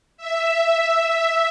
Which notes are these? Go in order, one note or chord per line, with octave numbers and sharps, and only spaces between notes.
E5